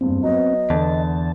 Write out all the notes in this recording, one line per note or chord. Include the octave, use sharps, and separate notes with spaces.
F#1 E2 G2 C4
F#3 B3 D#5
E2 D3 B3 A5